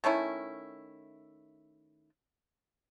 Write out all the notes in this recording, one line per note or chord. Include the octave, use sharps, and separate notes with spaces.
D#3 A3 C#4 E4